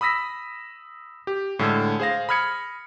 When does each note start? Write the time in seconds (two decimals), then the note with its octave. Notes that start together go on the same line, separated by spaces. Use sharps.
0.01 B5 D#6 E6 A#6 B6
1.27 G4
1.59 A2 D3 G#3 E6 F6 G#6
2.00 G#4 C5 F5 A#6
2.29 B5 D#6 F6 G#6 C#7